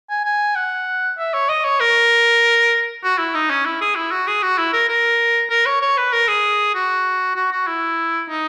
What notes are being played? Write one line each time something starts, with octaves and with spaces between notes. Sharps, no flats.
G#5
G#5
F#5
E5
C#5
D#5
C#5
A#4
F#4
E4
D#4
C#4
E4
G#4
E4
F#4
G#4
F#4
E4
A#4
A#4
A#4
C#5
C#5
B4
A#4
G#4
F#4
F#4
F#4
E4
D#4